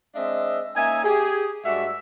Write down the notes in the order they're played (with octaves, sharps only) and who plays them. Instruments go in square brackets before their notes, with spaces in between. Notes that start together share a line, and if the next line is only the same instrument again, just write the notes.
[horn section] G#3 C4 D4 D#5 E5
A#3 C#4 D#4 E5 G#5
G4 G#4
G2 G#3 A3 F#4 D5 E5